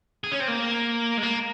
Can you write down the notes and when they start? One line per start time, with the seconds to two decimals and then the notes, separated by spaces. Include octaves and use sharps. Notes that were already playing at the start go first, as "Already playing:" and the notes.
0.24 G#4
0.32 C#4
0.40 C4
0.48 A#3
1.17 G#3
1.23 A#3